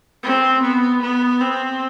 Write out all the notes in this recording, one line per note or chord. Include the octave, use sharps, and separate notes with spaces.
C4
B3
B3
C4